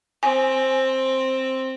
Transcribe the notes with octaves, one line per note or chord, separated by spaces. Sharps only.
C4 G#5